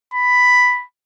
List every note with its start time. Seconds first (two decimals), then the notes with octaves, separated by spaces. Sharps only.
0.14 B5